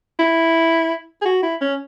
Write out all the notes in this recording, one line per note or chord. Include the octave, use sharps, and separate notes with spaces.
E4
G#4
F#4
E4
C#4